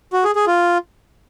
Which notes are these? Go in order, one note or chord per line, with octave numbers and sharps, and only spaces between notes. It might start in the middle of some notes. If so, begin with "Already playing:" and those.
F#4
G#4
G#4
F4